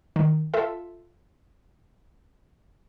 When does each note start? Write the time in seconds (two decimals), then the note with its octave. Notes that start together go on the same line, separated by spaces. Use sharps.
0.16 D#3
0.54 F4 A4 E5